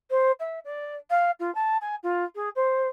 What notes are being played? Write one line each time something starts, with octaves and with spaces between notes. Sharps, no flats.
C5
E5
D5
F5
F4
A5
G#5
F4
G#4
C5